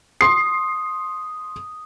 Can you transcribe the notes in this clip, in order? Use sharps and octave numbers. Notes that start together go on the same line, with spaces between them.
C6 D#6 C7